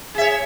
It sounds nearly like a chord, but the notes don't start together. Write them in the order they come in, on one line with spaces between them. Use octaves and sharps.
G#4 E5 C#5